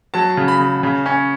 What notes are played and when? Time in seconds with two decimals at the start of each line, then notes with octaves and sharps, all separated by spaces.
0.14 F#3 A5
0.37 C#3
0.48 B5
0.60 C#3
0.83 C#3
1.06 C#4